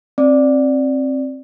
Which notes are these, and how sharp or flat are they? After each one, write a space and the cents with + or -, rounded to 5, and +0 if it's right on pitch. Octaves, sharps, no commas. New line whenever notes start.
C4 +25 D5 +0